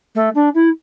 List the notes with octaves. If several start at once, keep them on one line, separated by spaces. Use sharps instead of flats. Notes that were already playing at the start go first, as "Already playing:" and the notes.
A3
D4
E4